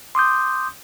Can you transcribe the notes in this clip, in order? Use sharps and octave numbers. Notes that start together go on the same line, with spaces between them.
C6 D6 D#6 G6